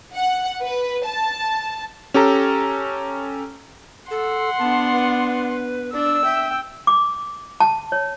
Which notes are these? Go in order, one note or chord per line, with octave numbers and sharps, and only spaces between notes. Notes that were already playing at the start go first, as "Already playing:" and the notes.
F#5
B4
A5
C#4 G4 A4 A#5
A4 F#5 C6
B3 D4 A5
B4
D4 D5 E6
E5 G5
D6
A5
C#5